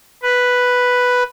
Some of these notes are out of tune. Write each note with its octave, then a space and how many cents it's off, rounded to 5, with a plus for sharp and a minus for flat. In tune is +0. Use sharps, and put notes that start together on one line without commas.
B4 +0